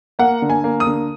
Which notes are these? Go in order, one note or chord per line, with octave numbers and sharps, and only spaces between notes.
A#3 F#5
D3
G#5
A#3
D#6
D3